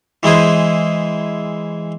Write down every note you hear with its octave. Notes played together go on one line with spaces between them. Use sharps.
E3 G#3 E4 G#4 C5